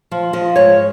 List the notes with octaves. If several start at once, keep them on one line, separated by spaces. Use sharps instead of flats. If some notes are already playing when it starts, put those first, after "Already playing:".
F3
F3 D#5
G#2 C#5